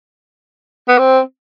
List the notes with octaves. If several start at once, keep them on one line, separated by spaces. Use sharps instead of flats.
B3
C4